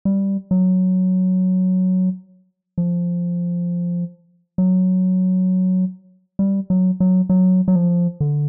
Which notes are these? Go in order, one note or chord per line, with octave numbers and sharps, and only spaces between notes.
G3
F#3
F3
F#3
G3
F#3
F#3
F#3
F#3
F3
D3